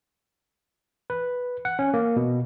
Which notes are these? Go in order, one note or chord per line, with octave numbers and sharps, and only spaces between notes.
B4
F#5
C#4
A#3
B2